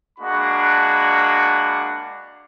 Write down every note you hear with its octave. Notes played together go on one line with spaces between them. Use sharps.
G#3 A#3 D4 F#4 F#5 B5